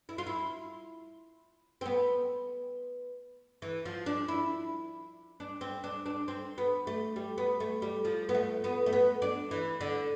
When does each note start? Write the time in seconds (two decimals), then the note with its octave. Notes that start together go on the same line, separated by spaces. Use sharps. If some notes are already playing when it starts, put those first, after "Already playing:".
0.09 E4
0.18 F4
0.27 E4
1.81 C4
1.85 B3
3.62 E3
3.85 F3
4.06 D4
4.28 E4
5.40 D4
5.61 C4
5.84 D4
6.06 D4
6.28 C4
6.58 B3
6.87 A3
7.16 G3
7.38 B3
7.60 A3
7.82 G3
8.05 F3
8.29 B3
8.34 A3
8.64 B3
8.86 A3
8.92 B3
9.22 D4
9.51 E3
9.81 D3